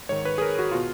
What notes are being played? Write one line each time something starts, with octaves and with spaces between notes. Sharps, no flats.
G#2 D#3 C#5
B4
G#4
A#4
F#4
B2 F4